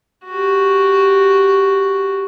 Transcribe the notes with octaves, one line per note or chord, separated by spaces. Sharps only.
F#4 G4